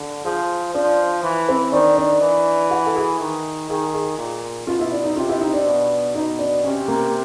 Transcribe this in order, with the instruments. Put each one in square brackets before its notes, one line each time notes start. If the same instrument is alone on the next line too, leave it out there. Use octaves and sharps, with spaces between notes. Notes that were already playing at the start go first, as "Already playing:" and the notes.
Already playing: [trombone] D3
[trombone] F3 [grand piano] G#4
[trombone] F3 [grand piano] D4
[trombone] E3
[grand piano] C4
[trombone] D#3 [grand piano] D4
[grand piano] D4
[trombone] E3
[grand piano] F#4
A4
G#4
[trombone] D#3
[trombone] D#3 [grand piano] G#4
[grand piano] G#4
[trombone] A#2
[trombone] B2 [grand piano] F4
[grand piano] E4
D4
D#4
[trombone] C3 [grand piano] F4
[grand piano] E4
D#4
D4
[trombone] B2
[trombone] B2 [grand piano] D#4
[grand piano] D4
[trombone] C3 [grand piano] C#4
[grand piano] A#3